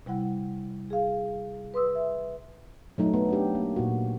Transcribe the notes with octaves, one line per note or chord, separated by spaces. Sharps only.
C3 G3 E4 F#5
G#4 F5
B4 C6 D#6 E6
E5
F#3 A3 D#4
B3
D4 D#4 G4
A#3
A#2 D#4 F#4